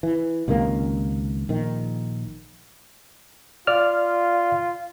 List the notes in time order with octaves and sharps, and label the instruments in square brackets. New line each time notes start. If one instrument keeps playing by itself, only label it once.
[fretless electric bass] E3
C#2 C3 D#3 A#3
A#1 D#3
[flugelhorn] F4 [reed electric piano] D5 F6